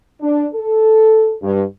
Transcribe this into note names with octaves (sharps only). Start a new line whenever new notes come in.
D4
A4
G2